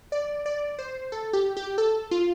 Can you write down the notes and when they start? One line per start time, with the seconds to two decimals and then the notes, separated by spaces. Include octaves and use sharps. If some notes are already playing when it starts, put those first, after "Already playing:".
0.12 D5
0.46 D5
0.79 C5
1.12 A4
1.33 G4
1.57 G4
1.78 A4
2.11 F4